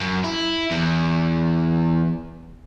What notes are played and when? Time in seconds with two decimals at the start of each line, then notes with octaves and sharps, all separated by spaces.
0.01 F#2
0.24 E4
0.71 E2